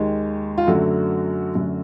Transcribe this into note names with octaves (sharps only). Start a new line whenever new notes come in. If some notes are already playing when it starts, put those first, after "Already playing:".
Already playing: D#2 D#3 G#3
F4
F#2 D3 F#3 A3 F#4
F#2 D3 F#3 A3